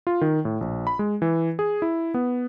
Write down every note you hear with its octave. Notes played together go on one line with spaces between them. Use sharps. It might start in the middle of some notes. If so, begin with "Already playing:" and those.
F4
D#3
A2
A#1
B5
G#3
E3
G#4
E4
B3